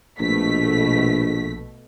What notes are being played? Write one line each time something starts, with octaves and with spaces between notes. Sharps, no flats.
A#1 B2 A3 B6